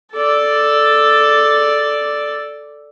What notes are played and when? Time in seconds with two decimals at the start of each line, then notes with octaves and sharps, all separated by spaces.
0.14 A4 D5